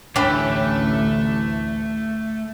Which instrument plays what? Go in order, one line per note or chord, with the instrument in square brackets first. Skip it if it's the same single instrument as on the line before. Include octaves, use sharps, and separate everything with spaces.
[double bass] A1 D2 [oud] E3 C#4 [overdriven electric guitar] A3 [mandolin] D4 G4 B5